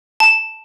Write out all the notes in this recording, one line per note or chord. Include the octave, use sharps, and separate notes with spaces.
A5